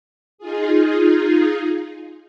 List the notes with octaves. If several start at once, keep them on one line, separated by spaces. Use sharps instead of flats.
D#4 F4 G#4